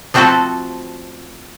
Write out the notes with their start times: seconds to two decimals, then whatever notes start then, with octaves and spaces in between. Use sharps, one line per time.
0.14 F3 A3 C4 E4 F#4 A4